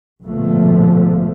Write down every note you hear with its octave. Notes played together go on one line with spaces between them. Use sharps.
A#1 G#2 B2 D3 F3 A3